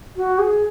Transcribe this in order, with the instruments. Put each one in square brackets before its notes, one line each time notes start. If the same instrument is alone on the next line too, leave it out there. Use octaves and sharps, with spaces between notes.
[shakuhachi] F#4
G#4